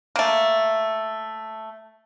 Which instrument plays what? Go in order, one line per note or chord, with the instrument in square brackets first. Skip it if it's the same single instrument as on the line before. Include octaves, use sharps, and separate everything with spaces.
[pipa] A3 A#3